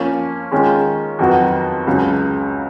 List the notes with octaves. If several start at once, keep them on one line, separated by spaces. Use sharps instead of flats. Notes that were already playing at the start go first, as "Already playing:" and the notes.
Already playing: F3 A#3 C#4
D#3 G#3 C#4 F4
F2 D#3 F#3 B3 F#4
C#2 C#3 F#3